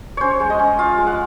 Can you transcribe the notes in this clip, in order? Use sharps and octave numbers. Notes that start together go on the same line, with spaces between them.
C#4 C5 C#5
G#3
D#5
C#4
F4 F5
G#3
F#5